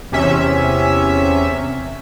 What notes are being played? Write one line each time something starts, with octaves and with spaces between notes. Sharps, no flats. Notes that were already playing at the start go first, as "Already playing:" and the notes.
E2 C3 C#4 E5